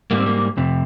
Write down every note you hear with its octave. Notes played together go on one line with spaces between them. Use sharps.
G#2 G3 A#3
C4
A#3
F2 C3